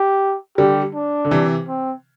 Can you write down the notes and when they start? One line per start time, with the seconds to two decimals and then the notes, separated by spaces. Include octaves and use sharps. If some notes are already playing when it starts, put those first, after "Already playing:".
Already playing: G4
0.58 D3 G3 G4
0.95 D4
1.25 D3
1.31 C3 E3
1.68 C4